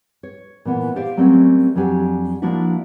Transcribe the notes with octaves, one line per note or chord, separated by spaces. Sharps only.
C#5
A#2 E3 B3
G4 C5 D5 E5 F5
F#3 G3 A3 C4 C#4 A#4
F2 F#3 D4 G4 G#5
F3 A#3 D4 E4 F#4 E5